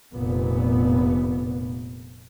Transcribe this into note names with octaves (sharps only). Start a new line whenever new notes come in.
F1 A#2 B3